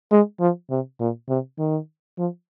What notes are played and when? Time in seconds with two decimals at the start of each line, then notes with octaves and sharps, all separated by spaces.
0.11 G#3
0.40 F3
0.70 C3
1.00 A#2
1.29 C3
1.59 D#3
2.18 F3